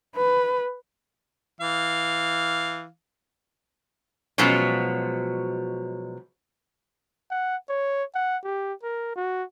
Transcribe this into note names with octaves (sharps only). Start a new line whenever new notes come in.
B4
E3 F5
B2 F3 F#3 G#3 C#4
F#5
C#5
F#5
G4
A#4
F#4